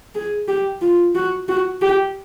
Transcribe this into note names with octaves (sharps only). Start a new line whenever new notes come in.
G#4
G4
F4
F#4
F#4
G4